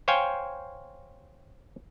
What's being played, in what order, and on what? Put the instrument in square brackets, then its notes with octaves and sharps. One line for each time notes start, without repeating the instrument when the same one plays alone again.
[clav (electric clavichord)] C5 C#5 F5 G5 G#5